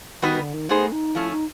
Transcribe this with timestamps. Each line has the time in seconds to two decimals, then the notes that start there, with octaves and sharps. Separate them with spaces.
0.22 D#3 G3 B3 D#4 F#4 B4
0.38 D3
0.54 D#3
0.69 A3 B3 D#4 G#4 C5
0.92 D#4
1.15 F3 A3 C#4 E4
1.31 D#4